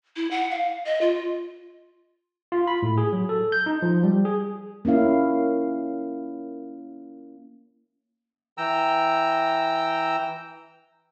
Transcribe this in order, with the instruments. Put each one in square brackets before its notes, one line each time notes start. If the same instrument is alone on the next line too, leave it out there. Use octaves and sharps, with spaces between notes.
[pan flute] E4
F#5
F5
D#5
F4
[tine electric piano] F4
B5
A2
G#4
F#3
A4
G6
D#4
F3
G3
G#4
[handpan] A#3 C#4 E4 F5
[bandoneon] E3 G5 A#5 E6